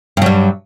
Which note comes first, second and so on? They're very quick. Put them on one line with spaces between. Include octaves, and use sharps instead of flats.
G2 F#3 G3